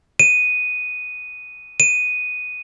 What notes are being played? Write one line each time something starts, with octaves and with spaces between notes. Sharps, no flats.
D#7
D#7